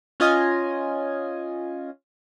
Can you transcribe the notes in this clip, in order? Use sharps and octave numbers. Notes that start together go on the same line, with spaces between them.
C#4 F4 D#5 G#5